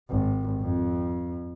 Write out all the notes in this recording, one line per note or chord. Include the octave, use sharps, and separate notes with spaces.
G#1
F2